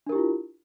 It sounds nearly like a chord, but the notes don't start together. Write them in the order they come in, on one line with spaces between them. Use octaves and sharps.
D4 A#4 G4 E4 F4